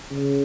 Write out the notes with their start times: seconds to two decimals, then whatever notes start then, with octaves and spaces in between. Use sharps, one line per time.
0.11 C#3